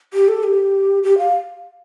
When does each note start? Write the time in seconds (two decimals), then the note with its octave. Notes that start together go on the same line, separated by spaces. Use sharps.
0.14 G4
0.28 A4
0.44 G4
1.03 G4
1.18 F5